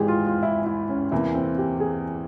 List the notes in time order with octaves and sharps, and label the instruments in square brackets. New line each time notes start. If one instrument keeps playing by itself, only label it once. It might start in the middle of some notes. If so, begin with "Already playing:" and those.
Already playing: [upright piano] G#1 G#2 E3 G#3 [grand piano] G4 G#4
[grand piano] F4
F4
E4
E4
C#4
[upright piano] E2 C3 E3 A#3 [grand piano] E4
[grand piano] C4
G4
G#4